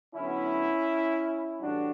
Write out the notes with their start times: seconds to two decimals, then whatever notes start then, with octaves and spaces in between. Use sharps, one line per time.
0.14 D3 F#3 B3 C#4 E4
1.60 A2 E3 G3 D4 F#4